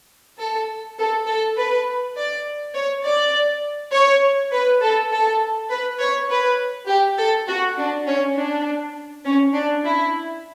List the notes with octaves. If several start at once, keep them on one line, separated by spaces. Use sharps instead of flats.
A4
A4
A4
B4
D5
C#5
D5
C#5
B4
A4
A4
B4
C#5
B4
G4
A4
F#4
D4
C#4
D4
C#4
D4
E4